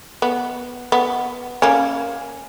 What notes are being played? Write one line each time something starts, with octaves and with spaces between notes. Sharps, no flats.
B3
B3
A#3 C#4